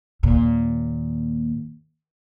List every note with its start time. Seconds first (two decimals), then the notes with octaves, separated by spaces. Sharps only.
0.23 D#2 A#2